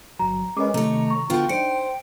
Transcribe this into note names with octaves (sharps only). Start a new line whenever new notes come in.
G1 F#3 A#5
G#3 C#4 A#4 B4 D#5 D6
C3 D#3 A3 C#5 A#5
C#6
D3 B3 F4 F#4 G5
D4 D#4 C5 C#7 D7